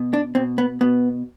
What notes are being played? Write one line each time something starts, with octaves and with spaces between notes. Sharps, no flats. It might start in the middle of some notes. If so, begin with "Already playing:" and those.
Already playing: B2
D4
B2 C4
B3
B2 B3